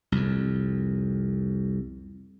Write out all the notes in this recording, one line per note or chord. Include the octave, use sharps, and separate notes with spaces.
C2 F2